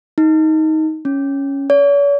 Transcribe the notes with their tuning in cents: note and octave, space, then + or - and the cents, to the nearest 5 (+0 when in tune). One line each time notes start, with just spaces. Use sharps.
D#4 +15
C#4 +0
C#5 +45